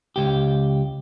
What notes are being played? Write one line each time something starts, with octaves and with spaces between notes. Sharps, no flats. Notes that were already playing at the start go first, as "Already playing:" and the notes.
C#2 G4